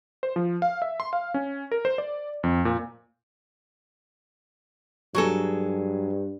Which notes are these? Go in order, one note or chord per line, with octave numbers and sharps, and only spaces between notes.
C5
F3
F5
E5
C6
F5
C#4
A#4
C5
D5
F2
A#2
G2 F#3 G#4 A4